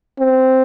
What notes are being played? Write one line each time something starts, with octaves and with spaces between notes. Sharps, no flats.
C4